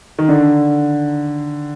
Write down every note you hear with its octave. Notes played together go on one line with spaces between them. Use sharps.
D#3
D3